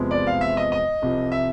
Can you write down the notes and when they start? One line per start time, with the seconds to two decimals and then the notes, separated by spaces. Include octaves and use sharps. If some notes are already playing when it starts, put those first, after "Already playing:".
Already playing: E2 C3 F3 G#3 B3
0.11 D5
0.27 F5
0.41 E5
0.57 D#5
0.72 D#5
1.02 C2 C3 F3
1.32 E5